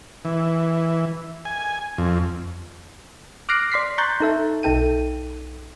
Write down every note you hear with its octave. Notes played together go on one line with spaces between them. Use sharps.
E3
G#5
F2
D6 F6 F#6 A#6 C7 D7
D5 C6 B6 C7
A#5 C6 C#6 F#6 G6 A6
D#4 A4 E5 A5
B1 D#4 A4 G5 D#7